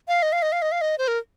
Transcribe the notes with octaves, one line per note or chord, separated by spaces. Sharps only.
F5
D#5
F5
D#5
F5
D#5
F5
D#5
C5
A#4